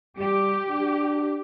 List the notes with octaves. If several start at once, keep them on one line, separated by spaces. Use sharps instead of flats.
G3 G4
D4